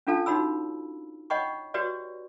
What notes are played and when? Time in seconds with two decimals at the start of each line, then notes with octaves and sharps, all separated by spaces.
0.07 C#4 D4 F4 A4 F5 A5
0.26 D#4 F#4 C#5 B5 E6
1.30 C#5 D#5 F#5 G5 B5 C#6
1.74 F#4 G4 B4 C#5 D5